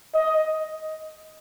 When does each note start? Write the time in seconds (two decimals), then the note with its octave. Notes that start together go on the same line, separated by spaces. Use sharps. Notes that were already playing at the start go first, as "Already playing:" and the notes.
0.14 D#5